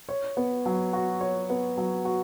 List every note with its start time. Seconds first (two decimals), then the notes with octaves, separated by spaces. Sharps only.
0.09 C#5
0.37 B3
0.66 F#3
0.93 F#4
1.21 C#5
1.50 B3
1.78 F#3
2.05 F#4